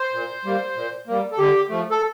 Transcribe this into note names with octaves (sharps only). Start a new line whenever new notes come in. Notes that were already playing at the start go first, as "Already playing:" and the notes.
Already playing: C5
A#2
G3 A#3
A#2
G3 A#3
A4
D3 G4
F3 A3
A4